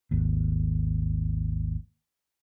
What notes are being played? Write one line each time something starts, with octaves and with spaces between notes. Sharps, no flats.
G#1 D#2